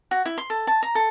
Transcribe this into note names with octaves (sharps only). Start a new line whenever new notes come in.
F#4
E4
C6
A4
A5
A#5
A4